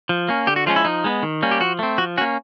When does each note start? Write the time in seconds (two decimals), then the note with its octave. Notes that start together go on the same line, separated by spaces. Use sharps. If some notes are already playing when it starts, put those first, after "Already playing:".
0.09 F3
0.29 A#3 C#4
0.47 D3 G4
0.56 F#4
0.66 F3 G#3 C#4 F4
0.76 E4
0.85 F3 D#4
1.04 G#3 B3
1.23 D#3
1.42 G3 A#3 C#4
1.51 G4
1.60 F3 F#4
1.79 A3 C4
1.98 F3 F#4
2.18 C#4 F#4
2.21 A#3